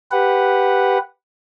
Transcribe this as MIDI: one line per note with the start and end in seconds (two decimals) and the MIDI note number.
0.11 0.98 67
0.11 0.98 71
0.11 0.98 78